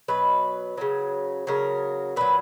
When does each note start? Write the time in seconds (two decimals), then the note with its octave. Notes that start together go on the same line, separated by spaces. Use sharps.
0.08 B2 F#3 B4
0.78 C#3 F#3
1.47 C#3 F#3 A#4
2.16 A#2 F#3 B4